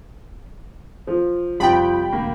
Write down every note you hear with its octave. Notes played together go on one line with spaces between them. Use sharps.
F3
F2 C3 F3 G3 G5 B5
E1 D2 A#3